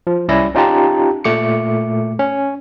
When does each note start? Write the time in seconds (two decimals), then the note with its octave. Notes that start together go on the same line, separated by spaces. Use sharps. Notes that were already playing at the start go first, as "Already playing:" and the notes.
0.07 F3
0.29 C2 C#4 E4 D5 E6 A#6
0.55 C#4 D#4 F4 G4 A5 A#5
1.24 A#2 A3 D6 C#7
2.19 C#4